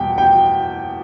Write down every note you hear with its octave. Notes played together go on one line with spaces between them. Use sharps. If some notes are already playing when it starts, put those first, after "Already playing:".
Already playing: E2 B2 G3 G5
G5